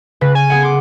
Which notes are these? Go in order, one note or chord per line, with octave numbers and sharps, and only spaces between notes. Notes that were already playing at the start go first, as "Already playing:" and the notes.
C#3 B4
G#5
B3 G#4 F#5
C6 D6